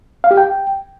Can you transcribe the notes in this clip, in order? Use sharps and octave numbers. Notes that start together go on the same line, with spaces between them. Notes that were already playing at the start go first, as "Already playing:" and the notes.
F5
G4
G5